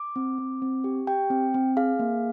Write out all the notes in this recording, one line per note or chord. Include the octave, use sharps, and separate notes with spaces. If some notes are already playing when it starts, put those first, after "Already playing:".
Already playing: D6
C4
C4
C4
G4
G4 G5
C4
C4
G#4 F5
A#3